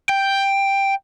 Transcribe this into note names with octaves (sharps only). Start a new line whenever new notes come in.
G5